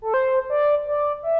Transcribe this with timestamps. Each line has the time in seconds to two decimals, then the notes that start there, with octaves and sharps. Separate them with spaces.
0.02 A4
0.14 C5
0.50 D5
0.87 D5
1.23 E5